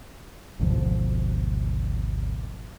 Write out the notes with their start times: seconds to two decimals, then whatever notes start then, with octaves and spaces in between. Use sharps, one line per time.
0.59 G#1 D2 B2 F3